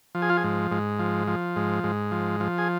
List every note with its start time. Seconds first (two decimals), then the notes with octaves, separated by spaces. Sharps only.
0.15 F3
0.22 G#4
0.30 F4
0.37 G#4
0.44 G#2
0.71 G#2
0.99 F3
1.27 F3
1.56 G#2
1.84 G#2
2.12 F3
2.40 F3
2.58 G#4